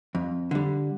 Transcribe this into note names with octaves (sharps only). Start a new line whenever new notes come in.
F2
D3 G3